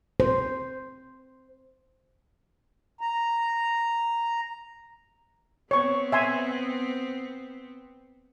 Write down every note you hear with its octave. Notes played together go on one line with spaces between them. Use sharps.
C5
A#5
B3 C4 C#5 C#6
E5 G#5 C6